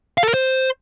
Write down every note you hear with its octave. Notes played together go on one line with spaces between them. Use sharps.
F5
A4
A#4
C5